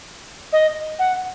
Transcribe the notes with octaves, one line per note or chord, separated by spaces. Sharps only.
D#5
F#5